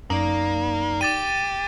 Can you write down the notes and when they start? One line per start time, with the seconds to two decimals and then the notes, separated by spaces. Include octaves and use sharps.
0.10 F#2 A#3 D#4 D5
1.01 G4 D6 A6 D#7